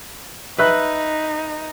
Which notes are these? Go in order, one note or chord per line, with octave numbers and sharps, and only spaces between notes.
D#4 B4 E5 F#6